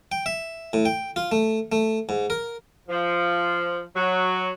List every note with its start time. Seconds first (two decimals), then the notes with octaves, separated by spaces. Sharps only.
0.12 G5
0.26 E5
0.73 A2
0.85 G5
1.16 F4
1.32 A3
1.72 A3
2.09 G#2
2.30 A#4
2.88 F3
3.95 F#3